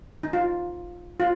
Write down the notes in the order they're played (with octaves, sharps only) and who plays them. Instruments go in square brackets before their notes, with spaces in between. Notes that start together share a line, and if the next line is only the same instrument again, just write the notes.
[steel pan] D#4
F4
F4